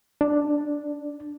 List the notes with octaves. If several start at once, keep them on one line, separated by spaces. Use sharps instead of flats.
D4